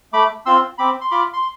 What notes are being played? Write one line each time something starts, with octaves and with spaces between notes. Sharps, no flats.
A3 B5 D6
C4 F4 C6 E6
C4 B5 D6
C6
F4 B5 D6
C6